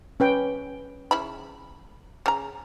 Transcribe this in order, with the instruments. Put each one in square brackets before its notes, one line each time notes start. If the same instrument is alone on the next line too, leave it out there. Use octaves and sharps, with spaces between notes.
[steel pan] C#4 B4 G5
[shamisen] C#3 E4 B5
C#3 A#5